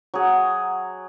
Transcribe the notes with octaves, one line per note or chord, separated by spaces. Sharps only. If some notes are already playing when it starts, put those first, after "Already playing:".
F#3 G#4